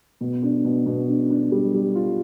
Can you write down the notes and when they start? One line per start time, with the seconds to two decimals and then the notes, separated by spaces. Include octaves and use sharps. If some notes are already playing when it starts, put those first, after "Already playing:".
0.21 B2
0.42 D4
0.65 B2
0.86 B2
1.08 D4
1.30 D4
1.52 G3
1.74 G3
1.95 F4